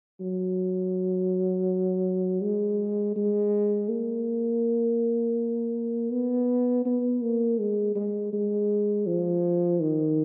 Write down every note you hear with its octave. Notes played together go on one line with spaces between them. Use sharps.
F#3
G#3
G#3
A#3
B3
B3
A#3
G#3
G#3
G#3
F3
D#3